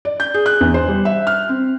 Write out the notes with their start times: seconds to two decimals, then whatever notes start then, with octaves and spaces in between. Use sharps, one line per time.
0.05 D5
0.20 G6
0.34 G#4
0.46 F#6
0.61 E2
0.74 C5
0.88 G3
1.05 E5
1.27 F6
1.49 C4